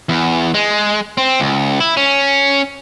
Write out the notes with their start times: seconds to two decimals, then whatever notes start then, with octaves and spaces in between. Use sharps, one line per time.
0.09 E2
0.54 G#3
1.18 C4
1.40 C#2
1.80 E4
1.97 C#4